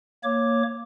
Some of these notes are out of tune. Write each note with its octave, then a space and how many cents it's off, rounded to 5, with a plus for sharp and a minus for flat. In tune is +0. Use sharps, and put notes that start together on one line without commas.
A#3 -5 C#5 +0 D6 +0